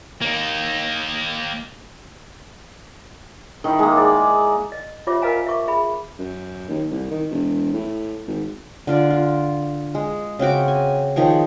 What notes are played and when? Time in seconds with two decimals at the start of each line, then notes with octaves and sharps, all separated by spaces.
0.22 A#3 D#4
3.64 D#3 E4
3.79 G#3 A#3
3.97 D5
4.72 D#5
5.07 F4 G4 C5 C#5 E5 D6
5.22 A#4 B4 D#5 F5 G#5 A#5
5.46 E5 C#6 D6
5.68 G#4 E5 B5
6.19 F#2
6.69 D#2
6.91 C2
7.10 D#3
7.30 E1
7.73 A2
8.27 G#1
8.87 D3 F4 D5
9.10 F4
9.95 G#3
10.39 C#3 C4 F#4 D6
10.68 G#5
11.16 D#3 F3 G#4 C#5